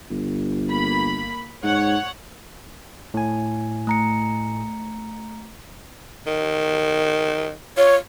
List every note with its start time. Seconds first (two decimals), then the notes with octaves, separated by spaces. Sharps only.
0.11 G1
0.70 A#3 B5
1.64 G#2 C#5 F#5
3.14 A2 G#5
3.87 A3 A#5 C#7
6.27 D#3
7.77 F4 C#5